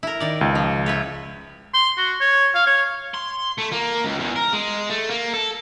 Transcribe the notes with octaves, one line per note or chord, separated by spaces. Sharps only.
E4 A#4
D#3 D5
C#2
F3
E4 B4 C#5
C6
F#4
C#5
F5
C#5
C6
A3
A#3
C#2
E2
A#4
G#3
A3
A#3
A4